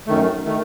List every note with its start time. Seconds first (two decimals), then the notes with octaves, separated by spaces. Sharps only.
0.07 F#2 D#3 A3
0.45 D#3 A3